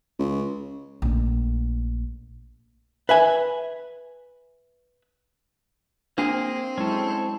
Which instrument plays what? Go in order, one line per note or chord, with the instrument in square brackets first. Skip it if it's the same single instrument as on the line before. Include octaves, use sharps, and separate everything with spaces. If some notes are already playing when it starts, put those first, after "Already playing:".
[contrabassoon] C#2
[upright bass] A#1 A3
[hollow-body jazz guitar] B4 E5 G#5
[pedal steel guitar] A#3 G#4 [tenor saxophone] C4 [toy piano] D4
[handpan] F#3 G#3 E4 [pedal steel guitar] C#4 A4